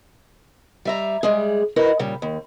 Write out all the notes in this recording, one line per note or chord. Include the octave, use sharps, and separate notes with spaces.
G3 E5 A#5
G3 G#3 G#4
E4 F#4 A#4 B4 D#5
A#2 C#3 G3
D#2